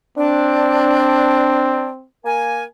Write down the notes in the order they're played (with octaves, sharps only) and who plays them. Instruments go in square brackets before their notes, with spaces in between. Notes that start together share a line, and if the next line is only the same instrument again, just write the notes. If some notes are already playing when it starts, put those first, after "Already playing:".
[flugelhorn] C4 [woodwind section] D4
[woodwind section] A#3 A#4 G#5